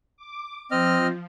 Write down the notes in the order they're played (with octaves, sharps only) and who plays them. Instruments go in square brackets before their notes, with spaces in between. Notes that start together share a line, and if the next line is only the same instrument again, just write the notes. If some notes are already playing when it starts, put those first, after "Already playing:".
[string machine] D6
[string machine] F3 [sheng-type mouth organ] C4 D#5 F6